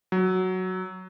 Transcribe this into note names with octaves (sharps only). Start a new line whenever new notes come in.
F#3